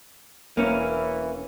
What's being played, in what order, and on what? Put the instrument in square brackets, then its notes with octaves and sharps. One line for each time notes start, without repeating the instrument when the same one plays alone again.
[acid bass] E1 [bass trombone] E3 [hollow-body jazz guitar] A#3 C#4